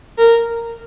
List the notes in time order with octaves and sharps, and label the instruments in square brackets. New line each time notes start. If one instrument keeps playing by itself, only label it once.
[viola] A#4